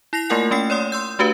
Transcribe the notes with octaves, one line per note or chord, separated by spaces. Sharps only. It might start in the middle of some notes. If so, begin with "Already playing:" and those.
E4 A#6 C7 F7
A3 A#3 F4 A#4 F#5 G#5
A3 C#4 G5 C7
C#5 D5 C6 D#6
C6 E6 G6
A3 D4 F#4 G4 B4 F5